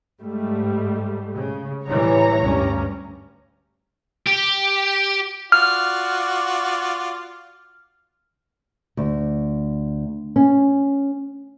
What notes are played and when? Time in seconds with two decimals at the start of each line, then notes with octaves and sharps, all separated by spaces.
0.22 G#2 G3 A3
1.35 C#3
1.87 A2 E3 G3 C#5 A#5
2.42 D2 G2 C#4
4.27 G4
5.52 F4 F#4 D5 F6
8.97 D2
10.36 C#4